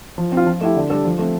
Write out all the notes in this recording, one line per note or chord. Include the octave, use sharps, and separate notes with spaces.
F3
C4
F4
F3
A3 E4 G4
D3
G3 D4 A4
F3
A3 C4